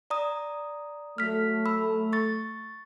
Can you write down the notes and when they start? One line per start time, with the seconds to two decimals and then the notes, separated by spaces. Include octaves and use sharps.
0.10 D5 A#5 D#6
1.18 F#3 A3 F6 B6
1.66 B5 E6
2.13 C#6 A6